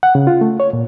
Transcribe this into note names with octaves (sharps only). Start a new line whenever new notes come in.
F#5
C#3
F4
A3
C#5
A#2